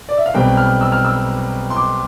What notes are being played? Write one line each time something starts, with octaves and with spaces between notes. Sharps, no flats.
D5
E5
F5
B1 B2 G3 C4 G5
F6
E6
F6
E6
C6
D6